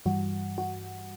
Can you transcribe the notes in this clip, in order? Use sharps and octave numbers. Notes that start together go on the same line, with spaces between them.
G2 E3 G3 F#4
F#4